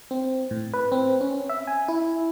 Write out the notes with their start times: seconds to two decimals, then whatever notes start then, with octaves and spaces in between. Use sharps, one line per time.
0.11 C4
0.51 A2
0.73 B4
0.92 C4
1.21 C#4
1.49 E5
1.67 G#5
1.88 E4